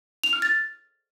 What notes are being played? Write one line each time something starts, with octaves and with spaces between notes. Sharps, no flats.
F7
F6
A6